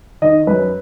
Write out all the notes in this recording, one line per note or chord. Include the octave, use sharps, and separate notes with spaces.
D#3 D#5
F#2 B4